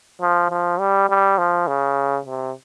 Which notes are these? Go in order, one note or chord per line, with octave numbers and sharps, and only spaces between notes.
F3
F3
G3
G3
F3
C#3
C3